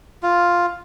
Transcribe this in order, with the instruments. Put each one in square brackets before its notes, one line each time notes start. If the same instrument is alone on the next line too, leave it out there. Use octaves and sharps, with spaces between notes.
[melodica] F4